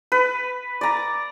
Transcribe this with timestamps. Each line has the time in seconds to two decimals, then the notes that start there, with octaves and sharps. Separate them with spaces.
0.12 B4
0.81 D5 A#5